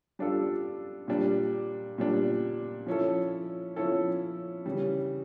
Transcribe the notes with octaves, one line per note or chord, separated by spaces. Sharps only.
G3 D4 F4 A4
A#2 G3 D4
A#2 G3 D4
F3 C#4 E4 A4
F3 C#4 E4 A4
C#3 E3 G3